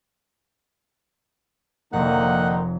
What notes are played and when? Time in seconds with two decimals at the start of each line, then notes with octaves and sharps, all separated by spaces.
1.93 F1 D3 D#3 A#3 D#4 F#5 F#6